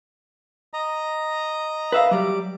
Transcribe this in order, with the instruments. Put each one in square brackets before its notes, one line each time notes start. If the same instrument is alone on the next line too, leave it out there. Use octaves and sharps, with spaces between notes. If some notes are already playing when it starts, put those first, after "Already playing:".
[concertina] D#5 A#5
[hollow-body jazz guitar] B4 E5 F5
[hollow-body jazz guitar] F#3 G3 [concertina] D6